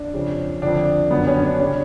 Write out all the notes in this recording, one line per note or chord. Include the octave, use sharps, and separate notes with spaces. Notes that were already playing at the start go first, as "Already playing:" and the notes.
Already playing: D4
F2 C#3
F2 D3 D4
F#2 D3 B3
C#4
C#4
D4
C#3 C#4